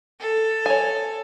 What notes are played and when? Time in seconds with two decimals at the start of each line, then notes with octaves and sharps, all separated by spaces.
0.20 A4
0.66 C#5 G#5